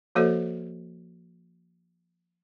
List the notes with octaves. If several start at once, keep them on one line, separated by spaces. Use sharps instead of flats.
F3 A#3 F#4 A4 C5 D#5